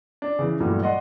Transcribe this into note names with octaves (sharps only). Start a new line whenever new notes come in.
D4
C#3 E3
G2 A#2 E3 F#3 G3 A3
D5 D#5 F#5 C6